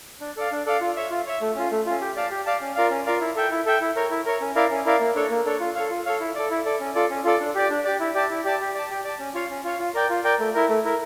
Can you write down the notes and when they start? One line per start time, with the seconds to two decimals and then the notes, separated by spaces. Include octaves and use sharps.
0.21 D4
0.36 A4 D5 F5
0.52 D4
0.66 A4 D5 F5
0.81 F4
0.96 C#5 E5
1.11 F4
1.26 C#5 E5
1.41 A3
1.56 C#4 F4
1.71 A3
1.86 C#4 F4
2.01 G4
2.16 D5 F5 A5
2.31 G4
2.46 D5 F5 A5
2.61 C#4
2.76 F4 A#4 D5 F5
2.91 C#4
3.06 F4 A#4 D5 F5
3.20 E4
3.35 A4 E5 G5
3.51 E4
3.66 A4 E5 G5
3.81 E4
3.96 A#4 C#5
4.11 E4
4.26 A#4 C#5
4.41 C#4
4.55 E4 A#4 D5 F5
4.71 C#4
4.85 E4 A#4 D5 F5
5.00 A#3
5.15 D4 A4 C#5
5.30 A#3
5.45 D4 A4 C#5
5.60 F4
5.75 A4 C#5 F5
5.90 F4
6.06 A4 C#5 F5
6.20 E4
6.35 A4 D5
6.50 E4
6.65 A4 D5
6.80 C#4
6.95 F4 A4 D5
7.10 C#4
7.24 F4 A4 D5
7.40 D4
7.55 G4 D5
7.70 D4
7.85 G4 D5
8.00 E4
8.14 G4 D5 A5
8.30 E4
8.45 G4 D5 A5
8.60 G4
8.75 D5 A5
8.90 G4
9.04 D5 A5
9.19 C#4
9.34 F4 C#5 F5
9.50 C#4
9.64 F4 C#5 F5
9.79 F4
9.94 A#4 D5 G5
10.10 F4
10.24 A#4 D5 G5
10.39 A3
10.55 E4 A#4
10.69 A3
10.84 E4 A#4